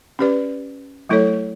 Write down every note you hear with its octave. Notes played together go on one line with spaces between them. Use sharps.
C#4 G4 B4 D5
F#3 A3 E4 A4 C#5